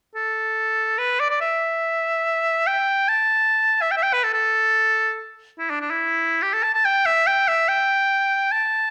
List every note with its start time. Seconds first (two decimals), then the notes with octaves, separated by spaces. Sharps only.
0.15 A4
0.98 B4
1.20 D5
1.30 D5
1.41 E5
2.67 G5
3.08 A5
3.82 E5
3.91 G5
3.97 E5
4.03 G5
4.13 B4
4.23 A4
4.34 A4
5.59 E4
5.70 D4
5.81 D4
5.90 E4
6.42 G4
6.53 A4
6.63 A5
6.74 A5
6.85 G5
7.06 E5
7.27 G5
7.48 E5
7.68 G5
8.52 A5